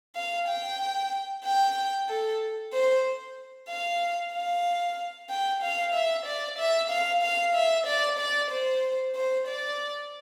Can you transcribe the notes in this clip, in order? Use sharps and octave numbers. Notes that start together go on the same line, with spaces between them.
F5
G5
G5
A4
C5
F5
F5
G5
F5
E5
D5
E5
F5
F5
E5
D5
D5
C5
C5
D5